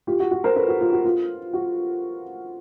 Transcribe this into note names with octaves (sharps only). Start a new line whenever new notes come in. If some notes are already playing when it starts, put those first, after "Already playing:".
F4 G4
F#4
F#4
A#4 C5
A4 B4
F#4
F4
F#4
F4
F#4